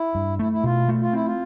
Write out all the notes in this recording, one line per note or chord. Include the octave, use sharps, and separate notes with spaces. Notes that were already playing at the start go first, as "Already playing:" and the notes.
Already playing: E4
G2
A3 E4
E4
B2 F4
A3
F4
C4 E4
F4